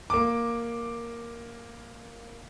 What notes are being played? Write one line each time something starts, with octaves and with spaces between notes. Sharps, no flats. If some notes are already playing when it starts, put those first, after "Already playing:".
A#3 D6